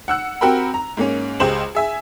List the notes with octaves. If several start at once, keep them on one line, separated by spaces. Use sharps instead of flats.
F#5 E6 F#6
C4 F#4 G4 A#4 G5 B5
A#5
G#2 A#3 C#4
C#2 G#3 G4 C5 E7 F#7
G#4 E5 G#5